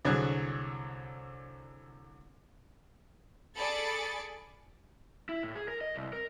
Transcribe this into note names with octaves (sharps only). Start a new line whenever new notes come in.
C2 D3 F#3 G#4 C#5 F#6
G#4 A4 D5 B5 A6 C#7
E4
A2
G#4
A#4
D#5
C2
A#4